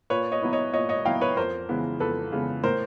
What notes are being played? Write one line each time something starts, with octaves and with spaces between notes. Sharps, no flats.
A#2 B4 C#5
C#5 D#5
F#3 B3 E4
C#5 D#5
A#2 C#5 D#5
C#5 D#5
F#3 B3 E4 F5 G5
B4 C#5
F2 A#4 C5
C#3 E3 G#3 B3
F2 A4 B4
C#3 E3 G#3 B3
A2 A#4 C5